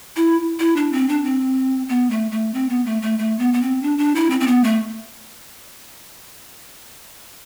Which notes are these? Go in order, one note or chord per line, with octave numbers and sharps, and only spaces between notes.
E4
E4
D4
C4
D4
C4
B3
A3
A3
C4
B3
A3
A3
A3
B3
B3
C4
D4
D4
E4
C4
C4
B3
A3